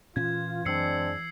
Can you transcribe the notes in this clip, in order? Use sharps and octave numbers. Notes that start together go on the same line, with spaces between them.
A#2 E3 C#4 F4 G#6
F#2 G#3 C4 D4 E6 C7 C#7